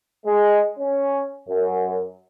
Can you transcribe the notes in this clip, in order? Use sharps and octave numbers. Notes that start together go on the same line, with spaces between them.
G#3
C#4
F#2